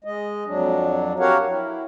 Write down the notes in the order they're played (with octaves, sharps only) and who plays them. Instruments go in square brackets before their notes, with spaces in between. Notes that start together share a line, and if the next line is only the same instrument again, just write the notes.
[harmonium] G#3 D#5
F2 F#3 D4
F#4 G4 A#4 C#5 F5 F#5
E4